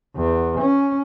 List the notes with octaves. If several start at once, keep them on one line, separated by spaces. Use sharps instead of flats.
E2
C#4